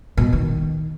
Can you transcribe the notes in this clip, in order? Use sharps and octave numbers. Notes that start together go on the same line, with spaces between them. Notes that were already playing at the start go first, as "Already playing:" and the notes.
B2
D#3